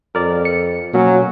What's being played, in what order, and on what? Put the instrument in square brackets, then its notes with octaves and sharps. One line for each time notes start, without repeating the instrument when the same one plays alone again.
[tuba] F2 [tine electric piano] A#4 D5
[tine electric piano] C#7
[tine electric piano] B2 A#3 C#4 [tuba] F#3